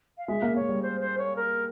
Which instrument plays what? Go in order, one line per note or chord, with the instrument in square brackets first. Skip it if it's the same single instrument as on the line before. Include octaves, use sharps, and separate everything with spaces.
[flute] F5
[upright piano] G#3 [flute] E5
[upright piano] A#3
[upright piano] A#3 [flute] C#5
[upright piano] G3
[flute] C5
C5
C#5
A#4